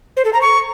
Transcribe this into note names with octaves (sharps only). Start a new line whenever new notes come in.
C5
A4
A#5
C#6